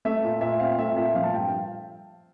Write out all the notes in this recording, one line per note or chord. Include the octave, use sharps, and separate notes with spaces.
A3 E5
A#2
A#2 E5
C4 F5
A3 E5
A#2 E5
F3 F5
A5
G2 G5